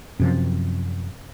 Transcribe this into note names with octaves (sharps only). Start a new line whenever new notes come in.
F#2 C3 F3